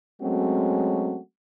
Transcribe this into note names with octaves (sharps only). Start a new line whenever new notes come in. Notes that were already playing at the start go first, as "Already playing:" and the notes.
F#3 G#3 A3 C4 C#4 F#4